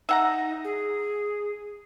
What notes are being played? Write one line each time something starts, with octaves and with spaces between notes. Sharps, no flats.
D#4 E5 F#5 A#5
G#4